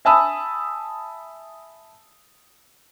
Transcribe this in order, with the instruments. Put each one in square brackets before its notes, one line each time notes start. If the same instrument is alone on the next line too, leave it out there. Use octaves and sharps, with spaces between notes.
[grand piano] E5 G#5 A5 B5 D#6 E6